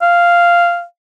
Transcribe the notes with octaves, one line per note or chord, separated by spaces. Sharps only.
F5